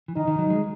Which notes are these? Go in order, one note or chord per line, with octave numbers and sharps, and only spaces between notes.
E3
D#3 D#4
D#3
F#3
G#3